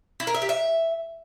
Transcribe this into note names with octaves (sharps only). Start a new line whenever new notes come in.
E4
A#4
E5
G4
E5